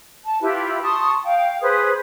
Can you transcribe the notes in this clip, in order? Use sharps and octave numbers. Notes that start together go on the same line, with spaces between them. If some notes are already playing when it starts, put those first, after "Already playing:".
A5
E4 F4 G4 B4
A5 C6 C#6 D#6
F5 G5
G#4 B4 C5 D#6